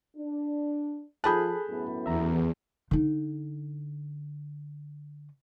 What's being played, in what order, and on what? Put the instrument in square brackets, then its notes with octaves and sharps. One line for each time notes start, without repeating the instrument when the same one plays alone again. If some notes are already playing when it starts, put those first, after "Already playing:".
[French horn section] D4
[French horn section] F3 [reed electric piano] G#4 A4 F#6 [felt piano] A5 B5 G6
[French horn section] F#2 A2 B3
[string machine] E2 [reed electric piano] E5 A#5
[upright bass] D3 D#4